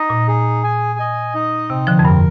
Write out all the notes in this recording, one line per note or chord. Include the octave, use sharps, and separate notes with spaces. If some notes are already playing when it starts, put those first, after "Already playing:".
Already playing: D#4 D#5
A#2
G#4
G#5
D#5
D#4
C3 C4
D3 F3
F2
G2 A#4